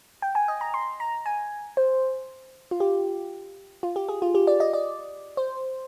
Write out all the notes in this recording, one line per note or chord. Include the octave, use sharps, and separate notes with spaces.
G5
G#5
D#5
A#5
C6
A#5
G#5
C5
F4
G4
F4
G4
G#4
F4
G4
D5
D#5
D5
C5